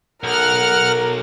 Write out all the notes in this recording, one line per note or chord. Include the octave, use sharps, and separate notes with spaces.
B1 A#4 F#5 F6